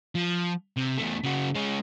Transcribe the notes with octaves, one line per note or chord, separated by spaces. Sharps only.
F3
C3
E2 A3
C#3 F#4
G#3 C#4